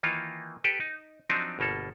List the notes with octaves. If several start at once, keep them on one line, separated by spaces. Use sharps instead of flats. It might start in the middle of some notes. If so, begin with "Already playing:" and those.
D#3 E3 A#3 D#4 F4
G4 A4 B4 G5
D#4
F3 F#3 C4 D4 D#4
G1 B2 A#3 A4